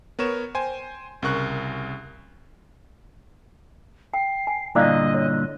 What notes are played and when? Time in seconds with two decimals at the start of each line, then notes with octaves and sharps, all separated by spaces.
0.19 B3 A#4 C#5 E7
0.55 C5 G5 G#5
1.22 C2 C#3 A#4 C#6 F#6
4.14 G5 C7
4.47 G#5
4.75 G2 A#2 D3 E4 D5 D#5 F5
5.14 C#5